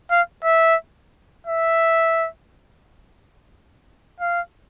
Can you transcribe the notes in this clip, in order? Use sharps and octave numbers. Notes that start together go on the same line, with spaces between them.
F5
E5
E5
F5